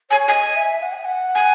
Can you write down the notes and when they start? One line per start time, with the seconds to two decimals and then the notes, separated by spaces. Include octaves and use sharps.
0.10 C#5 G#5
0.28 D#5 G#5
0.56 E5
0.82 F#5
0.93 G#5
1.04 F#5
1.35 G#5